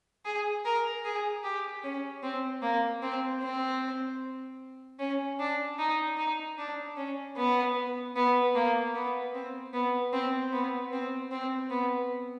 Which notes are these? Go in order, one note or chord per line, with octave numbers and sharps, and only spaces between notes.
G#4
A#4
G#4
G4
C#4
C4
A#3
C4
C4
C#4
D4
D#4
D#4
D4
C#4
B3
B3
A#3
B3
C4
B3
C4
B3
C4
C4
B3